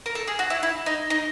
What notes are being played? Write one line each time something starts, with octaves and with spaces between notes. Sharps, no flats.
A#4
A4
G#4
F#4
E4
E4
D#4
D#4